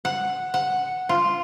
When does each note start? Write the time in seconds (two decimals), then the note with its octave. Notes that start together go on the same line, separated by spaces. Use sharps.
0.05 F#5
0.54 F#5
1.09 F4